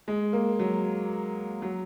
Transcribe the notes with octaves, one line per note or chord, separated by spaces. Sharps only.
G#3
A#3
F#3
F#3